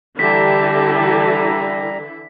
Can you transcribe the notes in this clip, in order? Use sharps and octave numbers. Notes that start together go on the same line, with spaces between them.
D3 E3 G3 E4 G4 A5 A#5 B6